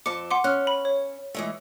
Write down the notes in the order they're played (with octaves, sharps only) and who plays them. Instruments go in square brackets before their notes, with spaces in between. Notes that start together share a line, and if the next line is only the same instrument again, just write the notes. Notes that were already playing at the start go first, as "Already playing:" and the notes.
[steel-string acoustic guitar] F2 C4 A5 [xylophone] D6 C#7
[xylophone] F#5 C6 D6
[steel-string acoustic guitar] C#4 [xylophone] F6 F#6
[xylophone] B5
C#5
[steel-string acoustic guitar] E3 G#3 A3